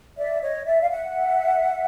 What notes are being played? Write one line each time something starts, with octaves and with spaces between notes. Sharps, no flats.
D5 E5
C#5 D#5
D5 E5
F5
E5 F#5